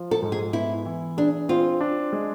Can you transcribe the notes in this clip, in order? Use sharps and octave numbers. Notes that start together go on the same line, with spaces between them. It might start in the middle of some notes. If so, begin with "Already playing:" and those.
Already playing: F3
A4
G#2
G#4
B3 E4
E3
D4 G#4
C4 F4
D4
G#3